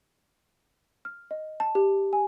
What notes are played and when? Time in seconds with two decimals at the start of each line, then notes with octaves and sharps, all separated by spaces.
1.05 F6
1.31 D#5
1.60 A5
1.75 G4
2.13 G#5